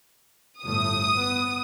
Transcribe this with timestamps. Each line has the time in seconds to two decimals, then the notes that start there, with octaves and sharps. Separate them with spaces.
0.63 G1 A2 A3 D#6
1.17 B3